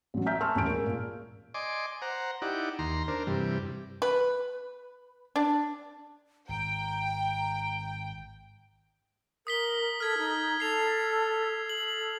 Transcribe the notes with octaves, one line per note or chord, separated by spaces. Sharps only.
A1 F#3
E5 G#5 A#5 F6 G6 B6
A5 C6 C#6 E6 F6
D#1 A1 C#4 G#5 G6 D7
G#3 A#4
A#2
D5 D#5 G#5 C6 D6
C5 F#5 A#5
D#4 E4 G4 D5 F#5
D#2 A#5 C6
D4 A#4 C5
G2 C3 E3 G3
B4
D4
G#1 G5 A#5
A#4 D#6 B6 G7
A4 F6 G#6 B6
D#4
A4 C7 F7
A4 F#7